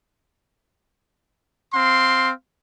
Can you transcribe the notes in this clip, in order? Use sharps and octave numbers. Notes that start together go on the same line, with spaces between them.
C4 F5 C6